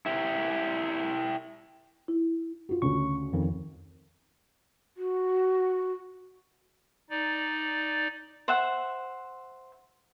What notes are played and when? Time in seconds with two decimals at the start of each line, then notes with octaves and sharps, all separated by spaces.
0.06 E4 G4
2.08 E4
2.69 F4 F#4
2.82 D2 C#3 C#6
3.33 F2 D#3
4.97 F#4
7.10 D#4 D5
8.48 C5 E5 F#5